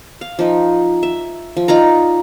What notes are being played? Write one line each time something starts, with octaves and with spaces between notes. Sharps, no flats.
F5
F3 D#4
E5
F3
D#4 F4 D5 A#5